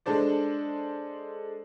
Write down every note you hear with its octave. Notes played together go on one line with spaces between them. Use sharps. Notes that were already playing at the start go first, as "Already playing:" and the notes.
G#3 D4 A4 C5 D5